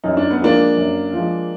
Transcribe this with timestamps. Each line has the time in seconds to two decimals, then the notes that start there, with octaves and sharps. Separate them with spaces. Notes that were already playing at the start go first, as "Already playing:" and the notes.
0.04 F#2 D#4
0.17 D4
0.31 B3
0.40 F3 G#3 A#3 D4
0.77 F#2
1.13 F3 G#3